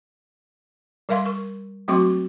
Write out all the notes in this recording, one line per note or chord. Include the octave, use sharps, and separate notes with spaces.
G3 A#4 E5 F5 C6
A#4 C#6
F#3 A3 C4 F#4 C6 D6